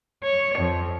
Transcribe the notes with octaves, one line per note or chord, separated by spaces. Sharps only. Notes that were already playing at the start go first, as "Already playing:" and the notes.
C#5
F2